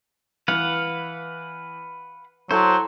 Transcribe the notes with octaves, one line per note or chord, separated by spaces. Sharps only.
E3 B4 F5 F#5
F#3 E4 A4 C5 C6